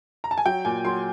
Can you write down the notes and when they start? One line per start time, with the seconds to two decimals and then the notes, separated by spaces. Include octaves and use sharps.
0.24 A#5
0.31 A5
0.38 G#5
0.46 F#3 G5
0.65 A#2 G#5
0.85 F#3 C6